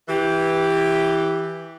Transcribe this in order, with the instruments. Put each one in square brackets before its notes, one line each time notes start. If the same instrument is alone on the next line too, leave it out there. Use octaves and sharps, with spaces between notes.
[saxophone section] E3 G4